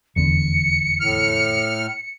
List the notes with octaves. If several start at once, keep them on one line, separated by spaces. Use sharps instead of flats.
F1 E2 D3 C#7
A2 F6